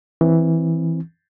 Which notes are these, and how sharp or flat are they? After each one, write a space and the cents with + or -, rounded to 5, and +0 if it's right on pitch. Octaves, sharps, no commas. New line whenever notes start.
E3 -10 C4 +0